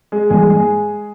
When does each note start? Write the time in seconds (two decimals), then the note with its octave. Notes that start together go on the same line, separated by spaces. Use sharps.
0.12 G#3 G#4
0.30 G#2 E3 G3 G#3 A#3 G#4
0.49 G#3 G#4